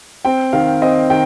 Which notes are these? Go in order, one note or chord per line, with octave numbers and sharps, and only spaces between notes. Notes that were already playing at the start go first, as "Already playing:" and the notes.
C4 G5
D#3 F5
C4 D#5
D#3 G5